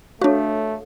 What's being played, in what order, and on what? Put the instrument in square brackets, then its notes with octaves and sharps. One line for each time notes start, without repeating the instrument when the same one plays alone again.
[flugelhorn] A3 [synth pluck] D4 F#4 [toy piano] A4 C#5 F5